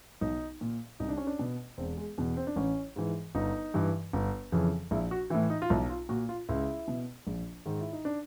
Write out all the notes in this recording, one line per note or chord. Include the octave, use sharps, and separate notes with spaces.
B1 D#4
A#2
C2 D#4
D4
C#4
D4
B2
E1 C4
G#3
E2 B2
C4
D4
A1 C#4
G#2 E3
G1 D#4
G2 E3
G1
F2 C#3 E3
A#1 E4
F#4
A2 E3 E4
D#4
F4
B1 E4
F4
A#2 F#4
F4
C#2 E4
B2
A#1
G#2 D#3
E4
D#4
D4